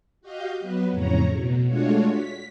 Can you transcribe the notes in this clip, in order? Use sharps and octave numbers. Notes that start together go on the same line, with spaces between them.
F#4 G4 D#5 F5 G6
F#3 B3 B4
F2 A2 C#3 C#5 A#5
B2
G#3 A3 D4 F4 F#4 C#5
B6